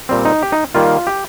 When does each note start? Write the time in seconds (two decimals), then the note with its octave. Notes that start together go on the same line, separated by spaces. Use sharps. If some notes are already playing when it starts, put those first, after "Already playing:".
0.09 A#2 G3 C4
0.25 D#4
0.43 G4
0.52 D#4
0.75 D#3 G3 A#3 F4
1.07 G4